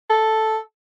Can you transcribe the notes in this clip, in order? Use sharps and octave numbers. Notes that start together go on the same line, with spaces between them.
A4